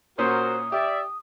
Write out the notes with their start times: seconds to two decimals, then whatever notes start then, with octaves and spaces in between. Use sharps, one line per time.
0.19 A#2 C#4 F#4 A#4 C5 D#6
0.72 G4 D5 E5